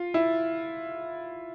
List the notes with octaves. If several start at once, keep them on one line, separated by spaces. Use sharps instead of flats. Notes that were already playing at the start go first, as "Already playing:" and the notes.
Already playing: F4
E4